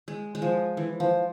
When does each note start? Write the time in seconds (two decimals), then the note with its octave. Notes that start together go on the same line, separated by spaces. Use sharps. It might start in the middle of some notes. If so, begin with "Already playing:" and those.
0.08 G#3
0.35 G#3
0.42 F3
0.77 E3
1.00 F3